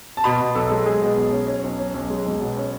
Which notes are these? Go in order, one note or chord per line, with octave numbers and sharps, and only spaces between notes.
A5
B2 B5
B2
B1 A4
G#3
G#3 G#4
B2
B1
C#4
C#4
B1
C#4
B1
G#3
B1
B2
C#4